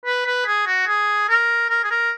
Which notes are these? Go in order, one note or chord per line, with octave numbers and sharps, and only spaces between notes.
B4
B4
G#4
F#4
G#4
A#4
A#4
G#4
A#4